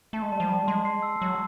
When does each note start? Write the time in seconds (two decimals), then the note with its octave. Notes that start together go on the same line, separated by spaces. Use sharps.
0.13 A3 A5
0.22 G#3
0.32 G3 A5
0.40 F3
0.49 G3 A5
0.67 G#3 C6
0.85 C7
1.02 E6
1.21 F#3 E6